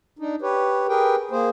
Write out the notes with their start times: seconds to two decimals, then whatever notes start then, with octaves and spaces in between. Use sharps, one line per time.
0.19 D4 D#4
0.42 G4 B4 C#5
0.88 G4 G#4 A#4 B4 G5
1.31 A#3 G#4 C5